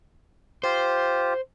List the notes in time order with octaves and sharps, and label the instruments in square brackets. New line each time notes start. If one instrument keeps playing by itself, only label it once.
[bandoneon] F4 G4 [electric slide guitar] C5